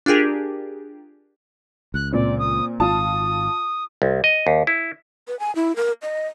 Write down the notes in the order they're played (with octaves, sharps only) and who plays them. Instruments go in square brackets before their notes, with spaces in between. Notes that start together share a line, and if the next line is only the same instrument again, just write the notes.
[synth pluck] D4 F4 G4 G#4 A#4
[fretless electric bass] C#2 [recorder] F#6
[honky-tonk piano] A#2 C4 [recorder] D5
[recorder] D#6
[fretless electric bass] G#1 [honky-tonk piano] F4 A5 [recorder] D#6
[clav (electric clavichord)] C2
D#5
D#2
E4
[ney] B4
G#5
E4
A#4
D#5